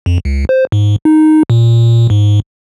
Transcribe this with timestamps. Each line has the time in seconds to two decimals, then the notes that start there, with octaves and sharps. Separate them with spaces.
0.06 F2
0.25 C#2
0.49 C5
0.72 G#2
1.05 D#4
1.50 A#2
2.10 G#2